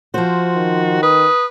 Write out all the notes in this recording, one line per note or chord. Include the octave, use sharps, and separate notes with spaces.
F3 F#4 C5
D#3
B4 D#6